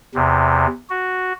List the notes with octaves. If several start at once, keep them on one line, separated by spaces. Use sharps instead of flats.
E2 C3
F#4